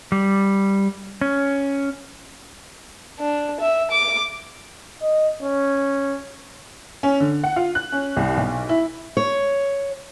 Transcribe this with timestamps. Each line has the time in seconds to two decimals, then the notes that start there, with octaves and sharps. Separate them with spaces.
0.12 G3
1.21 C#4
3.19 D4
3.60 E5
3.91 D6
5.02 D#5
5.43 C#4
7.03 C#4
7.20 D3
7.44 F#5
7.56 F4
7.75 F#6
7.92 C#4
8.16 C2
8.37 B1
8.69 E4
9.17 C#5